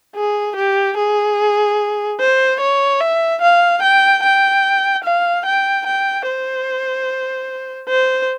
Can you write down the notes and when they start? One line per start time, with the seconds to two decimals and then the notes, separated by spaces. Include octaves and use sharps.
0.15 G#4
0.56 G4
0.97 G#4
2.19 C5
2.60 C#5
3.00 E5
3.41 F5
3.82 G5
4.23 G5
5.04 F5
5.45 G5
5.86 G5
6.27 C5
7.89 C5